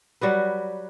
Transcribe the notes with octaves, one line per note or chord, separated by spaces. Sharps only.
F#3 G3 F#4 B4